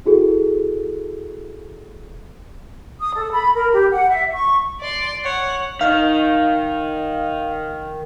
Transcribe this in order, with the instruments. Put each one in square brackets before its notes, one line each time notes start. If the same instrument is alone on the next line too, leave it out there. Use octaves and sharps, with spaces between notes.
[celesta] E4 F#4 G#4 A4
[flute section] D#6
A4
B5
A#4
G4
F#5
E5
C#6
[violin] D5 C6
[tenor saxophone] C#5 [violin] F#5
[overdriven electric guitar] D#3 [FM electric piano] F5